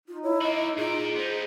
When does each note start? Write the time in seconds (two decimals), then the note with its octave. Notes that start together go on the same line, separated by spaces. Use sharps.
0.08 D#4 F4
0.23 E4 C#5
0.41 A#3 F#4 D#5
0.78 A#2 F4 G#4 D5
1.16 B3 D#4 C5